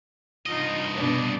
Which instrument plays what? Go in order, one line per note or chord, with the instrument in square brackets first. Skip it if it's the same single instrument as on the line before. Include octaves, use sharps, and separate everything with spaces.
[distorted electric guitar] G2 D#5 [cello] D#4 F4
[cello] B2 D4